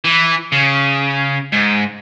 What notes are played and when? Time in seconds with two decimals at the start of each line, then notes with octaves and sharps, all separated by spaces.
0.04 E3
0.52 C#3
1.53 G#2